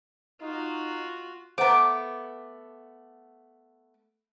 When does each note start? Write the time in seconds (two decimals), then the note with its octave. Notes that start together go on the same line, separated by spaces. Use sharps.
0.42 D#4 F4 F#4
1.58 A3 B3 C5 F#5 A#5 D6